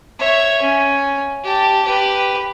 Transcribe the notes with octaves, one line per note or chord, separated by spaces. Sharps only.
C#5 E5
C#4
G4 A5
G4 B4